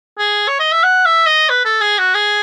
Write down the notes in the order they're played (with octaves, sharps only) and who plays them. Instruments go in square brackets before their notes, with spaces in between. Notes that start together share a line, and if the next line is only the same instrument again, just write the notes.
[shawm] G#4
C#5
D#5
E5
F#5
E5
D#5
B4
A4
G#4
F#4
G#4